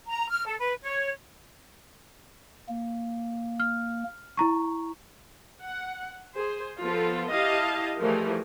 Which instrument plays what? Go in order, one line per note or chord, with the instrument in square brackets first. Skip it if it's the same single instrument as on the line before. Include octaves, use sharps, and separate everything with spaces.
[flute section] A#5
F6
A4
B4
C#5
[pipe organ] A#3
[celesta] F6
E4 A#5 C#6
[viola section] F#5
G#4 C5
F3 B3 F4 A4
E4 G4 D#5 F5 A5
E3 F3 G3 A3 G#4 A#4